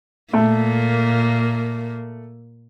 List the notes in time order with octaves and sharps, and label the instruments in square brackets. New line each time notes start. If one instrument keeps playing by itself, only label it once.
[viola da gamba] A#2 A#3 [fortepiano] A3